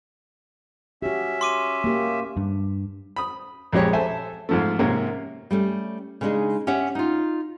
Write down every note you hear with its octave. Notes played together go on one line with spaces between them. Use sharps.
C#4 F#4 G4 E5
C6 D6 D#7
A#3 G4
G2
B5 D#6
A#1 F2 G#3 G4 C#5
A4 C5 E5 G#5 A5
G#2 F3 A3
G#2 C3 A#3 C#4
G3 A3 C#4
C#3 G#3 B3 D4 D#4 G#4
C#4 G4 C#5 E5 F#5
D#4 F4